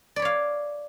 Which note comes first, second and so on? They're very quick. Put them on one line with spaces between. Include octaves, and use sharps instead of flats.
D5 B5 C#5 F5